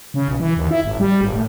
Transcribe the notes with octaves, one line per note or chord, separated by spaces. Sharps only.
C#3
B1
E3
D#2
E4
G#1
G3
G#1
A2